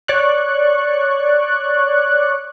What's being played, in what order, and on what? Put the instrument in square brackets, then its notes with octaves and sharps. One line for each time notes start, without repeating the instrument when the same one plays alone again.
[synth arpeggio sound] C#5 D5 C#6 F#6